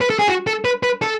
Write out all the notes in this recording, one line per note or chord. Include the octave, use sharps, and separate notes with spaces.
B4
A4
G#4
F#4
A4
B4
B4
A4